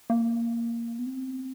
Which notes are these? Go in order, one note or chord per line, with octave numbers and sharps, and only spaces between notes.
A#3
B3
C4